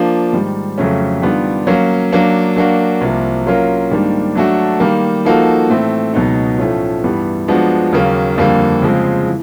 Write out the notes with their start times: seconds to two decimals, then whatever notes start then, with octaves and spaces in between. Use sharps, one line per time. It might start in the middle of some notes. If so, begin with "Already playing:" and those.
Already playing: F3 A#3 D4
0.33 G#2 D#3 G3
0.78 F2 C#3 F#3 A3 C#4
1.22 D#3 G3 B3 D4 F4
1.67 F#3 A#3 C#4
2.12 F#3 A#3 D4
2.56 F#3 A#3 D4 F#4
3.01 C2 C3 F3 A#3
3.46 F#3 A#3 C#4 F4 A#4
3.91 G#2 D#3 G3 A#3 D4
4.35 F#3 A3 D4 F#4 A4
4.80 D#3 G3 A#3
5.25 F3 A#3 D#4 F#4 A4
5.70 A2 E3 A3 C4
6.14 C#2 B2 F#3 B3 D#4
6.58 A2 F3 A3 C#4 F4
7.03 G2 E3 G3 B3
7.48 F3 G#3 B3 D4 F#4
7.93 D#2 C#3 F#3 A#3
8.38 F2 D3 G3 A#3
8.82 C#3 F3 G#3 C4
9.27 E3